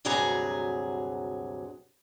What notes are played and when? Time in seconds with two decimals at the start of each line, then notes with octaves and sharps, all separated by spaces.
0.05 D2 G2 C3 F#3 G#4 A#5